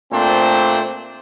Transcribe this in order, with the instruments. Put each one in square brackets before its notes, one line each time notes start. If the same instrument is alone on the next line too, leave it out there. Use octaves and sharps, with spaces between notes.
[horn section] A#2 A3 C4 D4 C5